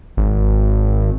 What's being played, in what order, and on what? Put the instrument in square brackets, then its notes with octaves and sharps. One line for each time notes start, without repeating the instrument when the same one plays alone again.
[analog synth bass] G#1